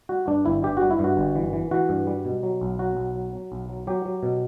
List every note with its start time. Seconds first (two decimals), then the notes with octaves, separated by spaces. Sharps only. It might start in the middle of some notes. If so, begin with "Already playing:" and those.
0.09 G3 F#4
0.27 G2 D4
0.45 G1 E4
0.63 G2 G4
0.77 G3 F#4
0.91 E4
0.99 G2
1.04 F#4
1.17 G1
1.36 E3
1.53 E3
1.71 E3 F#4
1.89 G2
2.07 G3
2.25 B2
2.43 F#3
2.61 B1
2.79 F#3 F#4
2.97 B1
3.15 F#3
3.33 F#3
3.52 B1
3.69 F#3
3.87 F#3 G4
4.05 F#3
4.23 B2